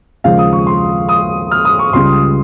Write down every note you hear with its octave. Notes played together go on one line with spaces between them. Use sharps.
D#2 C#3 F3 G#3 F5
D#6
C#6
C6
D#6
F6
D#6
C#6
C#2 C#3 G3 C6